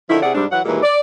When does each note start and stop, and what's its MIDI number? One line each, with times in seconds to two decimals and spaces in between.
0.09 0.18 50
0.09 0.18 51
0.09 0.18 53
0.09 0.18 64
0.22 0.31 48
0.22 0.31 64
0.22 0.31 68
0.22 0.31 74
0.22 0.31 78
0.35 0.45 44
0.35 0.45 48
0.35 0.45 55
0.35 0.45 56
0.35 0.45 62
0.51 0.60 52
0.51 0.60 54
0.51 0.60 78
0.65 0.79 39
0.65 0.79 46
0.65 0.79 52
0.65 0.79 55
0.65 0.79 56
0.83 1.00 74